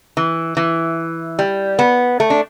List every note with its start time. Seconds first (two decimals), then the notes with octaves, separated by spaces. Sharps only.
0.17 E3
0.57 E3
1.39 G3
1.79 B3
2.20 A3
2.30 D4